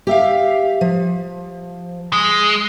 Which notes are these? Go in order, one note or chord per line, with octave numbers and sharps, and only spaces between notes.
G4 E5 F5
F3
G#3